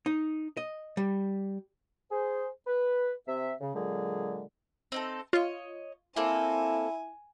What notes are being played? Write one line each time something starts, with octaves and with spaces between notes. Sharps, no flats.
D#4
D#5
G3
G#4 C5
B4
C3 E5
C#3
A#2 D3 F#3 G#3 G#4
C4 D#4 A4
F4 C#5 D#5
A#3 C4 E4 A4 G#5